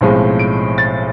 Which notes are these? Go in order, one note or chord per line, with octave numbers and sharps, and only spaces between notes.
B1 A2 F3 G#3 C4
D7
A6